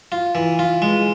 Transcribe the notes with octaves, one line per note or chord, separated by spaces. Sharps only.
F4
E3
F4
G#3